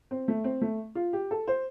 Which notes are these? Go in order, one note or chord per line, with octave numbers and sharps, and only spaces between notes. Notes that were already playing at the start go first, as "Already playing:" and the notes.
C4
A3
C4
A3
F4
G4
A4
C5